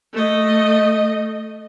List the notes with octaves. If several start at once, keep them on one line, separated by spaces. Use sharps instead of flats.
A3 D#5